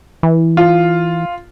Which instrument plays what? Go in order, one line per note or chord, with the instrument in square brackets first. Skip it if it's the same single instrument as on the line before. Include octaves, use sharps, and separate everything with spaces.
[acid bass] E3
[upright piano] F4